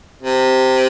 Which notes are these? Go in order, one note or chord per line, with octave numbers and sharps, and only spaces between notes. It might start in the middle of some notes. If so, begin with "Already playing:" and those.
C3